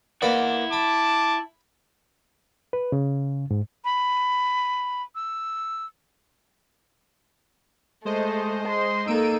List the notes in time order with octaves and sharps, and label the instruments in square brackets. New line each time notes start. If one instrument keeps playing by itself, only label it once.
[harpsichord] A#3 B4 D5 [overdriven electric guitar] E4 F#5
[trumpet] A5 [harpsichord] B5 [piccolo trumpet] D6
[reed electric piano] B4
C#3
G#2
[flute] B5
E6
[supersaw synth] G#3 C5 D#5 [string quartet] A3
[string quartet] C6
[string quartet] A#3 D#4 A4 [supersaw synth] E6 D7 D#7